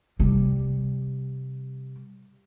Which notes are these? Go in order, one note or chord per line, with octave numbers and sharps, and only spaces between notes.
C3 G3